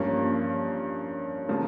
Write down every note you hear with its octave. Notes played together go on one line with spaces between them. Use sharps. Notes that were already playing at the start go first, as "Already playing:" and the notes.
Already playing: G2 F3 A#3 C#4
C#3 F3 A#3